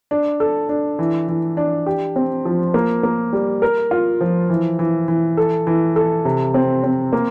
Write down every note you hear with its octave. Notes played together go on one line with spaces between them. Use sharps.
D4
A4
D4
E3
E3
D4
G4
C4
F3
A#3
A#3
G3
A#4
F4
F3
E3
E3
E3
A4
E3
A4
C3
C4
C4
A#3